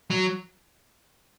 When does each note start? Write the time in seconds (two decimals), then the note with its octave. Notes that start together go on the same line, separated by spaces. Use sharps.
0.11 F#3